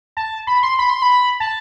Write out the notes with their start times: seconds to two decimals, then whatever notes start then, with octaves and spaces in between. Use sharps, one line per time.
0.17 A5
0.47 B5
0.63 C6
0.79 B5
0.90 C6
1.02 B5
1.40 A5